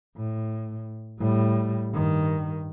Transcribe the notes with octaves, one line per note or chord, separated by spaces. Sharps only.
A2
A2 G3
G2 D#3